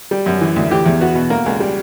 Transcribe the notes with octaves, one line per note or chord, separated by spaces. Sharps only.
G3
F#2
E3
D2
E3 G4
E2
B3 F#4
B2
A#3
C#2
G3